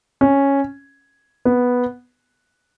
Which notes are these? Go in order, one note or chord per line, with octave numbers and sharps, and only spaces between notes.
C#4
B3